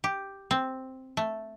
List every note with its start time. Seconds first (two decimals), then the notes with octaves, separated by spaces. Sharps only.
0.04 G4
0.51 C4
1.17 A3